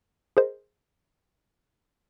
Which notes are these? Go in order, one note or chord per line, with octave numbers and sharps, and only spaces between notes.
G#4 A#4 C5 D#5